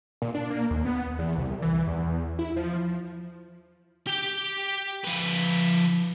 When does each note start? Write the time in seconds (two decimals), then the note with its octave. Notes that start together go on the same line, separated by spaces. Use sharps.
0.22 A#2
0.34 D4
0.50 A#3
0.70 D#2
0.85 B3
1.19 E2
1.37 C2
1.62 E3
1.87 E2
2.39 E4
2.56 F3
4.07 G4 G5
5.05 F3 B4